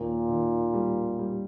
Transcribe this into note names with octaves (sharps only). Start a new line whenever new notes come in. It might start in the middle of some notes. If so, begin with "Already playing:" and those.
Already playing: D#2 A#2
D#3
G3
G3